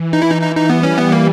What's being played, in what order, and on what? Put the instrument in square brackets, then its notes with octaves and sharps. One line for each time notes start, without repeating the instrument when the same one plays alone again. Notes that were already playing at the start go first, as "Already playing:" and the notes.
Already playing: [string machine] E3
[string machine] E3 [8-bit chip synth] D#4
[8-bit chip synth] E4
D#4
[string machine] E3 [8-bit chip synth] D#4
[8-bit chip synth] D#4
[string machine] G3 [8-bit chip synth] B3
[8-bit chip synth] C#4
B3
A#3